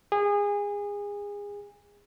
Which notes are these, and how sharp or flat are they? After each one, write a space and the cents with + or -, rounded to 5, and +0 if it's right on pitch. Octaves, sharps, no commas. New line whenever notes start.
G#4 -25